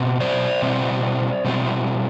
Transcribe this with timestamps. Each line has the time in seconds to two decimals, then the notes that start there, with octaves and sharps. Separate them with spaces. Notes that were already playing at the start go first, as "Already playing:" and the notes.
Already playing: B2 C4
0.20 C5 D5
0.62 B2 G3 C4
1.45 B2 G3 C4